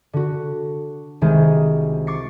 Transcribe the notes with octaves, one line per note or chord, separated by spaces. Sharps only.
D3 F#4
C2 D#3 G#3
C#6 D6 A6 C7 C#7